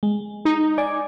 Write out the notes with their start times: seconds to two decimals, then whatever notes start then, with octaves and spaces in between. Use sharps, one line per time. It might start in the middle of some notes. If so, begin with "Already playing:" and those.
0.03 G#3
0.45 D#4
0.78 D5 G#5